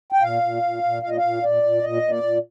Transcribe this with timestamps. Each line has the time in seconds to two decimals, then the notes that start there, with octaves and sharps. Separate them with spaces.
0.12 G5
0.22 A#2 F5
0.42 A#2
0.63 A#2
0.83 A#2
1.03 A#2 F5
1.09 D#5
1.17 A#2 F5
1.43 A#2 D5
1.63 A#2
1.82 A#2 D#5
2.02 A#2
2.10 D5
2.23 A#2